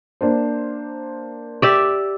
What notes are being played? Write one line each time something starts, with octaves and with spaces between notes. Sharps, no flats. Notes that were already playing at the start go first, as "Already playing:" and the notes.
A#3 D4 C5
G4 D5 E5